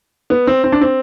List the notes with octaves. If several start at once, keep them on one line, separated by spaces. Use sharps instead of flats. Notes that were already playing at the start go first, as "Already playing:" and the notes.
B3
C4
C4
D4
C4